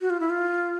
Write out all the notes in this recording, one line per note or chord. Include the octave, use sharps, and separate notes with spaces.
F#4
F4
E4
F4